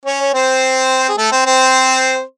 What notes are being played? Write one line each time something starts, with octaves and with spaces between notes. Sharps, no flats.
C#4 C#5
C#5
C4 C5
G#4
A3 A4
C4 C5
C4 C5